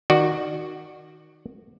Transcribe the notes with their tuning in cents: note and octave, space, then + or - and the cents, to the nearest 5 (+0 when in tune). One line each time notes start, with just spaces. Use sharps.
D#3 +0 F#4 +0 D5 +20